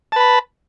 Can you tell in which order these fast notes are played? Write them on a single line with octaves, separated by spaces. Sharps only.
A5 B4 B5